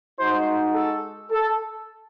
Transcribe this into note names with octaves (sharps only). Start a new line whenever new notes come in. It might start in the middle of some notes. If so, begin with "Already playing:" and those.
G#3 D#4 F#4 C5
A4
A4